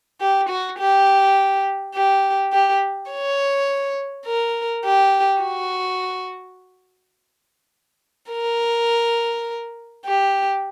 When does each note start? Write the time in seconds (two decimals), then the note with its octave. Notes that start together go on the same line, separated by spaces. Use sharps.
0.21 G4
0.49 F#4
0.79 G4
1.95 G4
2.53 G4
3.11 C#5
4.26 A#4
4.85 G4
5.42 F#4
8.32 A#4
10.06 G4